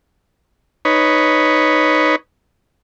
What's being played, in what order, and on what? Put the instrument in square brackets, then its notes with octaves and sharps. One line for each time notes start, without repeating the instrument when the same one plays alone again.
[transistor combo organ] D#4 B4 C#5